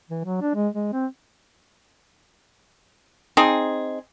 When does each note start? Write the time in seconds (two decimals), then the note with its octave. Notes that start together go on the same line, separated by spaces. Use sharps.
0.10 E3
0.25 F#3
0.41 D4
0.55 G#3
0.74 G#3
0.93 C4
3.37 C4 D#4 G#4